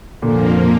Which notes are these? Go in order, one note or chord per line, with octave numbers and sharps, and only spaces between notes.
F2 A#2 D3 F3 A#3
A#2